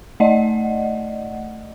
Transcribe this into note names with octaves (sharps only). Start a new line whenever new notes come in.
A3 D5 D#5 F#5